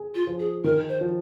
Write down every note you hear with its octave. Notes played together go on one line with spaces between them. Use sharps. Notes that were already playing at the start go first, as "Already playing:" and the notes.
Already playing: G#4
F4
F3
G#4
D#3 A#4
C5
F3